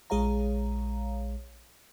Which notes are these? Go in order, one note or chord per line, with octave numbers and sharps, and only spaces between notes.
A#1 G#3 G#4 C#5 F5 A#5